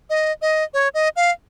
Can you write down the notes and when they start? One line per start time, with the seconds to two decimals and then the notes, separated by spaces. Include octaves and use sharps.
0.10 D#5
0.42 D#5
0.74 C#5
0.94 D#5
1.16 F5